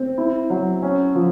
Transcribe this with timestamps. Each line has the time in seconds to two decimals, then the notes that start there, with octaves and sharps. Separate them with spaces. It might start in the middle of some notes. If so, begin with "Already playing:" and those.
Already playing: C4
0.18 E4
0.50 F#3
0.83 C#4
1.15 F3